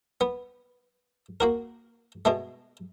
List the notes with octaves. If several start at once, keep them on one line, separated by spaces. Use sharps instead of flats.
B3
A#3 F#4 A#4
B2 G#3 A3